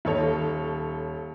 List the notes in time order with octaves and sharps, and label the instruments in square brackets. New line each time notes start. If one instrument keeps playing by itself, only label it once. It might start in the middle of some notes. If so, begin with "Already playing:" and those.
[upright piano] D#1 A4 C#5